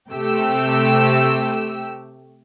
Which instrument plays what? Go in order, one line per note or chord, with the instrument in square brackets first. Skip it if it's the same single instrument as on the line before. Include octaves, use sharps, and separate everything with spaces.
[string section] C3 A3 G4 E6